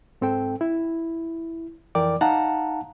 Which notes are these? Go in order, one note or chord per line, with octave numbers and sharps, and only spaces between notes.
G#2 C4 A4 G5
E4
F2 E3 A#4 D5 G5 D6
D#4 F5 F#5 A5 A#5